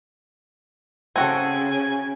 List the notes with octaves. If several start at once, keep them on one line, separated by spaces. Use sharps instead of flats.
C#3 C4 F#4 A4 G#5